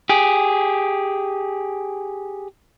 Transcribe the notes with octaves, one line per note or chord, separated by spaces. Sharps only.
G4 G#4